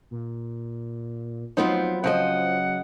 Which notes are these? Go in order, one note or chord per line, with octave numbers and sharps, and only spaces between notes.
A#2
F3 F#3 B3 C4 D#4 C5
C#3 F3 C4 D#5 F#5